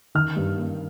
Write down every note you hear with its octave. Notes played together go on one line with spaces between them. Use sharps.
D#3 F6
G2
A#3